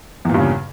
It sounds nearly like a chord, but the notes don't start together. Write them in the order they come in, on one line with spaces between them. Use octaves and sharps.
E2 A#2 G2 C#3